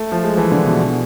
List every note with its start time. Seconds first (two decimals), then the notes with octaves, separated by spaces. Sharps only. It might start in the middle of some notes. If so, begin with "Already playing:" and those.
Already playing: A3
0.12 F3
0.24 G#3
0.38 E3
0.52 D3
0.65 B2